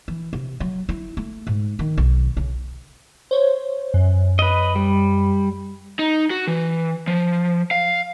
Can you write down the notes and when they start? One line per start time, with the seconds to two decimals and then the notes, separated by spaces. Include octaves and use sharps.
0.08 E3
0.33 C3
0.60 F#3
0.89 E4
1.17 A3
1.47 G#2
1.79 D#3
1.98 B1
2.37 C#3
3.31 C5 C#5
3.94 F#2
4.39 B4 D#5
4.76 G3
5.99 D#4
6.30 F#4
6.47 E3
7.07 F3
7.71 F5